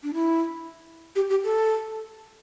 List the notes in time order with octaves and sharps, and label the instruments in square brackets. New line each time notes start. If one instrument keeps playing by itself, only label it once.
[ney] D4
E4
G4
G4
A4